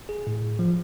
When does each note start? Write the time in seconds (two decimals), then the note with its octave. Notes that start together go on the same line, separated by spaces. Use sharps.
0.09 G#4
0.27 A2
0.59 F3